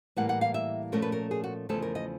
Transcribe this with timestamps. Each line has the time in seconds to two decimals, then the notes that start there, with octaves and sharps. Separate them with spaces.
0.16 A2 E3 G3 A#3 F#5
0.29 F#5
0.41 F5
0.54 E5
0.92 A#2 F3 A3 C#4 A#4
1.02 B4
1.12 A#4
1.31 G#4
1.44 F#4
1.69 E2 C#3 F3 A3 A4
1.82 A#4
1.95 D#5